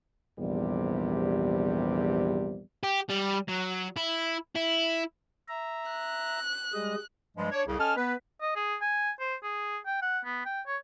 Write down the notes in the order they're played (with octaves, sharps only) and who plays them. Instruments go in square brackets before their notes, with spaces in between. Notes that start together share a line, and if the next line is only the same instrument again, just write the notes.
[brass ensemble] A#1 E2 C3 G3
[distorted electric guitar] G4
G3
F#3
E4
E4
[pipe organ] E5 A#5
[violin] F#6
[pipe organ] G3 G#3 D#5
[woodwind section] G2 F3 G3 G#3
D4 C#5
C2 F2 C#3
C#4 A4 D#5 G#5 A5 F6
B3 B4
[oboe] D#5
G#4
G#5
C5
G#4
G5
F#5
B3
G5
C#5